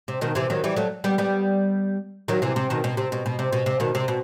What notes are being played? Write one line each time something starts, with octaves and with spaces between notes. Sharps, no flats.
C3
B2 D#3
C3 E3
D#3 F#3
E3 G3
F#3 A3
G3 B3
G3 B3
D#3 F#3
C3 E3
C3
B2 D#3
B2
C3
B2
B2
C3
B2
C3
B2 D#3
C3
B2